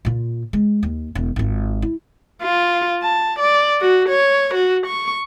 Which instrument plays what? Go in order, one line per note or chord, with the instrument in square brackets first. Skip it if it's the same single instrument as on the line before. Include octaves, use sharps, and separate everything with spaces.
[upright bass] A#2 F4
G#3
D#2
E1
G#1 F4
E4
[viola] F4
A5
D5
F#4
C#5
F#4
C#6